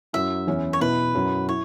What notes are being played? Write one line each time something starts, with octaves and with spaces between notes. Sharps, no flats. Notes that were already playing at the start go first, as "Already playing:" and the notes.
F#2 F#3 E4 E5
E2 E3 C#4 E4
C#5
B2 B3 E4 B4
F#2 F#3 E4
E4 C#5